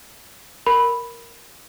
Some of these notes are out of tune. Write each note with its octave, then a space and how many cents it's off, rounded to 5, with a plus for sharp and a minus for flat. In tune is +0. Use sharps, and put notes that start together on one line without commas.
A#4 +0 B5 +0